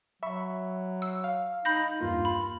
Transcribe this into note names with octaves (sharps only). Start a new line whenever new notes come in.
F#3 E5 B5 C#6
E6
F5
D#4 B5 G6 A#6
E2 G2 A#3 F4
B5